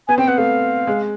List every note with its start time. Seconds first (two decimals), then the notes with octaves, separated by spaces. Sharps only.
0.08 B3 G#5
0.18 C4 G5
0.28 B3 F#5
0.38 A3 F5
0.87 G#3